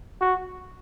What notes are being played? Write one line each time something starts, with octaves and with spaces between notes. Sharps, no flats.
F#4